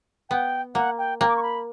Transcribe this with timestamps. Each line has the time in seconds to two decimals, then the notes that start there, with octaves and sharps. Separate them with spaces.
0.30 B3 G5
0.75 A#3 F#5
0.99 G5
1.20 A#3 G5
1.29 D6
1.37 C#6
1.43 B5